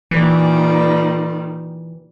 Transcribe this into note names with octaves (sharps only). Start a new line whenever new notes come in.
A#2 D#3 E3 G3